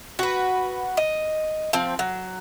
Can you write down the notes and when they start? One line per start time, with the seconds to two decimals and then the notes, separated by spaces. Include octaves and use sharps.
0.19 F#4 B4
0.97 D#5
1.73 F3 C4
1.99 F#3